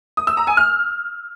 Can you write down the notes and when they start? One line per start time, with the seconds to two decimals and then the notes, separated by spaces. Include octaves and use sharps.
0.17 D#6
0.27 E6
0.37 A#5
0.47 G#5
0.57 F6